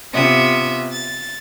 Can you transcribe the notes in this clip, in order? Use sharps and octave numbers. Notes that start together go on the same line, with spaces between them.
C3 B3 F4 E5 D#6
A6